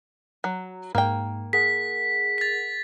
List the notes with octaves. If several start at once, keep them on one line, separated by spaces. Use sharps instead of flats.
F#3
G#2 A#3 G5
G#4 A#4 F#5 B6
A6 B6